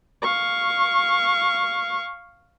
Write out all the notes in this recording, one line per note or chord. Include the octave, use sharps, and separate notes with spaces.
F5 C#6